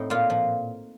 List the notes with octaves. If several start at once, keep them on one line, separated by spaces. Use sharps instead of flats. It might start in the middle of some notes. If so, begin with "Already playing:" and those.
Already playing: A2 C4 D#4
A#2 F4
F3